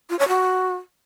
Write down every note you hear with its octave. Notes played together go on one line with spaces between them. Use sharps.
F4
C#5
F#4